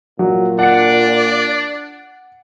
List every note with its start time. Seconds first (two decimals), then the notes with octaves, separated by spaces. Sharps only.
0.19 A#2 F#3
0.59 D4 D5 F#5 C#7